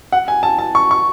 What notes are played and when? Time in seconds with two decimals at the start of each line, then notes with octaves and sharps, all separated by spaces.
0.12 F#5
0.28 G#5
0.43 A5
0.59 A5
0.75 C#6
0.91 C#6